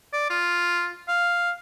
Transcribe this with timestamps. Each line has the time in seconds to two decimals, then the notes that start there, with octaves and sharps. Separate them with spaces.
0.13 D5
0.30 F4
1.08 F5